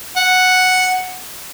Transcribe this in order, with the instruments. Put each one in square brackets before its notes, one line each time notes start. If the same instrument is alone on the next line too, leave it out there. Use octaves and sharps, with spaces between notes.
[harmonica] F#5